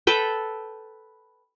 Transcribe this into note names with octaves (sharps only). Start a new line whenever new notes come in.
A4 B4 G5